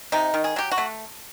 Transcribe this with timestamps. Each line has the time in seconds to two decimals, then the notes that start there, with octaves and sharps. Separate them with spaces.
0.12 C3 D#4
0.34 D#3
0.44 G#4
0.56 F#3 G4
0.71 F#4
0.78 A3